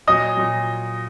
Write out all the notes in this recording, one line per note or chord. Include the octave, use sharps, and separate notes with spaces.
A#2 F#3 D#5 D#6
A#2 F#3